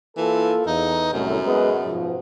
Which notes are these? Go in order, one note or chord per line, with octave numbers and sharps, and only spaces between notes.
E3 A#3 F4 A4
E2 D#4
C2 F#2 A2
G#3 B3
G#2 B2 F3